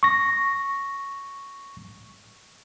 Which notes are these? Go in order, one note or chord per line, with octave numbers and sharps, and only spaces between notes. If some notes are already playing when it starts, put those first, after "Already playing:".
C#6 A#6